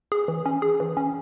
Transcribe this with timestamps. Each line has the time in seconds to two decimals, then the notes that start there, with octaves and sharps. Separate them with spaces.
0.12 G#4
0.28 E3
0.46 C#4
0.62 G#4
0.80 E3
0.97 C#4